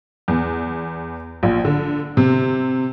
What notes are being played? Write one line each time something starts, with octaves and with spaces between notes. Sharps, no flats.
E2
A#1
D3
C3